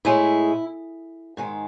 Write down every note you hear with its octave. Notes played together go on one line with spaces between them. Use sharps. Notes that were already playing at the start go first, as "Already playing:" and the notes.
A2 G#3 E4
G#2 D#3 G#3